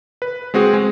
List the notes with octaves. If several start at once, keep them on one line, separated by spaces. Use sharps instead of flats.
B4
G#3 C4 F#4 G#4
G#3